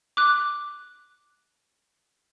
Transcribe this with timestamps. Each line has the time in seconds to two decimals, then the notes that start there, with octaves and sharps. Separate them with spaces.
0.17 D6 F#6